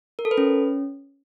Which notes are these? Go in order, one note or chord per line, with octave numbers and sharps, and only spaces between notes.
A#4
A4
B4
C#4